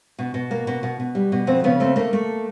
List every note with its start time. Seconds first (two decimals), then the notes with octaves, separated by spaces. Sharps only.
0.19 B2
0.34 B2
0.51 A#3
0.67 B2
0.83 B2
1.00 B2
1.15 G3
1.32 B2
1.47 F2 C4
1.64 C#3 B3
1.80 A3 C4
1.96 A3 A#3
2.13 A3